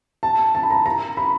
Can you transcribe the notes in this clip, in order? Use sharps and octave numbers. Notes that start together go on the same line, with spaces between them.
A5
A5
B5
A#5
A#5
B5